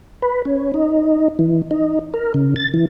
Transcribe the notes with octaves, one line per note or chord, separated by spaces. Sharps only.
B4
C#4
D#4
E3
D#4
A#4
C#3
A6
E3